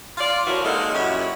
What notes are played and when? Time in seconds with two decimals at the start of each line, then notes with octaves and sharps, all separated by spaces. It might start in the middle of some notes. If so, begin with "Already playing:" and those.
0.18 F4 D5
0.47 E3 F3 G3 C#4 F#4 A#4
0.65 G#3 A#3 D#4 F#4 A4 A#4
0.94 F#2 A#2 G3 E4 F#4 C#5